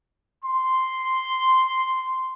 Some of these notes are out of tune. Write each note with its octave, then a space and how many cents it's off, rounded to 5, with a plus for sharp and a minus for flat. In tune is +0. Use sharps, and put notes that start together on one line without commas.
C6 -5